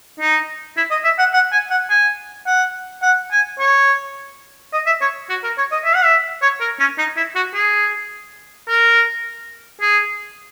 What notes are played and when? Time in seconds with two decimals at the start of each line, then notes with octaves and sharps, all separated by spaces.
0.20 D#4
0.77 E4
0.91 D#5
1.04 E5
1.19 F#5
1.33 F#5
1.52 G#5
1.70 F#5
1.90 G#5
2.47 F#5
3.03 F#5
3.32 G#5
3.59 C#5
4.73 D#5
4.87 E5
5.01 C#5
5.29 F#4
5.44 A#4
5.58 C#5
5.72 D#5
5.85 E5
5.95 F#5
6.04 E5
6.42 C#5
6.61 A#4
6.80 C#4
6.98 D#4
7.17 E4
7.35 F#4
7.54 G#4
8.68 A#4
9.81 G#4